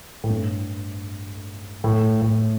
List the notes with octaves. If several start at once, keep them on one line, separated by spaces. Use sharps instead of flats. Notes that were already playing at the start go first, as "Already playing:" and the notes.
A2
G2
A2
A2